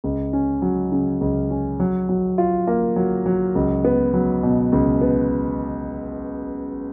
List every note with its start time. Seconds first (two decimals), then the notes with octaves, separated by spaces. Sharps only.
0.04 C#2
0.33 C#4
0.62 F#3
0.92 C#3
1.21 C#2
1.50 C#4
1.80 F#3
2.09 F#3
2.38 F4
2.67 A#3
2.96 F#3
3.26 F#3
3.55 C#2
3.84 B3
4.14 F#3
4.43 B2
4.72 C#2
5.01 B3